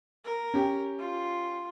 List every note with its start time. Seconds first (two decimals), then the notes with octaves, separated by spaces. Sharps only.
0.25 A#4
0.54 C#4 G4
0.99 F4